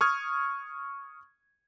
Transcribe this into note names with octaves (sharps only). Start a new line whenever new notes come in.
C#6 D#6 F6 G#6